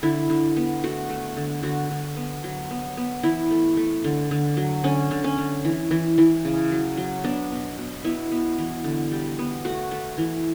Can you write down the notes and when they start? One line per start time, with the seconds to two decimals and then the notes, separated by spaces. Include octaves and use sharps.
0.03 D3 E4
0.30 D3
0.56 B3
0.83 A3 F#4
1.09 A3
1.37 D3
1.63 D3 F#4
1.91 D3
2.17 B3
2.44 F#3
2.71 B3
2.97 B3
3.23 E3 E4
3.51 A3
3.77 A3
4.04 D3
4.31 D3
4.57 F#3
4.84 D3 C#4
5.11 D3
5.24 C#4
5.38 D3
5.65 E3
5.91 E3
6.18 E3
6.45 C#3
6.71 F#3
6.97 F#3
7.24 B3 D4
7.52 B2
7.78 B2
8.04 B3 E4
8.32 B3
8.58 E3
8.84 D3
9.12 G3
9.39 B3
9.65 A3 F#4
9.91 A3
10.18 E3